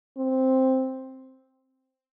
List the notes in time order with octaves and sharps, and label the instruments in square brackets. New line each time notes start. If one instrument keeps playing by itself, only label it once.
[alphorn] C4